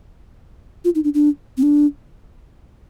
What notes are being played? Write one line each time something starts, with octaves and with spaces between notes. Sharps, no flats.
F4
D#4
D4
D4
C4
D4